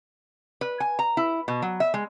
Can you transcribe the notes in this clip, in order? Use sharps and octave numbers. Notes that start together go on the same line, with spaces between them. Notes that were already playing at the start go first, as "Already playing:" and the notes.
B4
G#5
A#5
E4
B2
F#3
E5
G#3